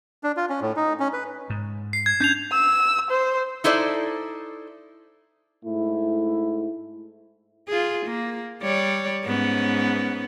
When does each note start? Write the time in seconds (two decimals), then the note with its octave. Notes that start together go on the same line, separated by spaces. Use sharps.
0.24 D4
0.37 F4
0.50 C#4
0.61 A2
0.76 D#4
1.00 C#4
1.13 B4
1.50 G#2
1.93 C7
2.06 G#6
2.20 C#4 D4 G6 C7 F7
2.53 E6
3.10 C5
3.64 D#4 E4 A4 C5 D5
5.65 G#2 A3 E4
7.68 F4 G#4
8.06 A#3
8.62 G3 C#5 D5
9.24 G#2 B3 C#4